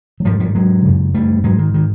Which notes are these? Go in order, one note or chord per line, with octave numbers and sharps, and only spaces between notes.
F#3
G#2 F3 G3
F3 G3
F#3 G#3
F#2 C#3
G3 A3
G#2 F#3 G#3
D#3
D#3